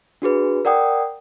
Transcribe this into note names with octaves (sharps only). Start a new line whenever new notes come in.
D4 F#4 G#4 B4
A#4 D5 F#5 G5 D#6